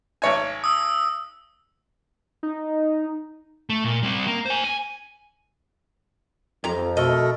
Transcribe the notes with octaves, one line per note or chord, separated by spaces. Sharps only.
G#1 C#5 G#5
D#6 E6
D#4
A3
A#2
G3 C4
A#3
C5 G#5
G#5
F2 C3 A#5
B2 A3 A4 A#4 D#5